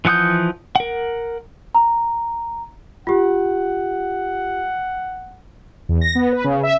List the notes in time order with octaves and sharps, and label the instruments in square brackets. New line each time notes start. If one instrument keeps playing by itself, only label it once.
[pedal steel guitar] E3 F3 F#5 D#6 G6
A#4 F#5
[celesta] A#5
[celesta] F4 G4 [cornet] F#5
[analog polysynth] E2
A#6
B3
B4
C#3
E5